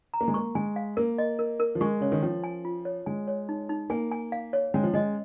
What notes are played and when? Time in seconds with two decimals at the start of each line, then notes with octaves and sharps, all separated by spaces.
0.14 A#5
0.21 A#3
0.28 G#3
0.34 A#3 C#6
0.55 G#3 G#5
0.76 F5
0.97 A#3 A#4
1.18 D#5
1.39 A#4
1.60 A#4
1.75 F3
1.81 G#3 C#6
2.01 C#3 C#5
2.12 D#3
2.23 F3 C#4
2.44 G#5
2.65 F4
2.85 C#5
3.06 G#3 G#5
3.28 C#5
3.49 D#4
3.69 D#4
3.90 A#3 G#5
4.11 G#5
4.32 F5
4.53 C#5
4.74 G#3 C#4
4.83 F3
4.94 G#3 D#5